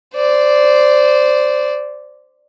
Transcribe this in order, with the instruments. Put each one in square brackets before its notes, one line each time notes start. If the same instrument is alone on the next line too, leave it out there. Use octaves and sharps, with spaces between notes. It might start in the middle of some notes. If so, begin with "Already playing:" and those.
[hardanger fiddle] C5 D5